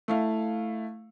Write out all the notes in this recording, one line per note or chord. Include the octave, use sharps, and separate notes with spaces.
A3 E4 F5